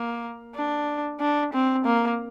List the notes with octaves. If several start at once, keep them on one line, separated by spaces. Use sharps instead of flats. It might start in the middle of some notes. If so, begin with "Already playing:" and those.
Already playing: A#3
D4
D4
C4
A#3